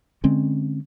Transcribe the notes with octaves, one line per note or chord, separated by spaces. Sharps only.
D3 G#3 C4 C#4